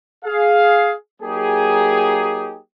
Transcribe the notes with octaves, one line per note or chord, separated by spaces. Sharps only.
G#4 F5
F#3 A#3 D#4 G4 G#4